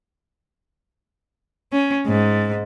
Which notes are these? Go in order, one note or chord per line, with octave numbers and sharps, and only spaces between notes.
C#4
G#2